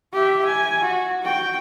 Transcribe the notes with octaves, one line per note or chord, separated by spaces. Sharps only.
G4 E5
G#5
F#4
F#4 G5